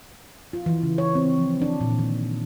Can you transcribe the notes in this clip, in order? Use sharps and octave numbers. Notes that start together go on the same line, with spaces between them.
F4
E3
C#3
C#5
C4
F3
D4
A#2
D#3